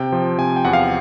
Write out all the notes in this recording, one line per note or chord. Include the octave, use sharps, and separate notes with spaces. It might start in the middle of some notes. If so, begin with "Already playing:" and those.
Already playing: C3 G5
F3
C3 G#5
G5
E2 F#5
F5